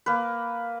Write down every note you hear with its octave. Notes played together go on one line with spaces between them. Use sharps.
A#3 B4